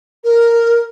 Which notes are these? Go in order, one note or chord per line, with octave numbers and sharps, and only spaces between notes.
A#4